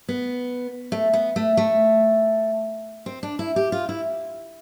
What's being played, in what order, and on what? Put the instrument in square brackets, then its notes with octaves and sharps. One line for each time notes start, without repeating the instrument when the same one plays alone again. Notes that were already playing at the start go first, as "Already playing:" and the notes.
[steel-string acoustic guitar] B3
A3
B3
A3
A3
C4
D4
E4
G4
F4
E4